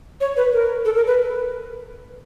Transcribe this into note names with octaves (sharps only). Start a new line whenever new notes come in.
C#5
B4
A#4
A4
A#4
B4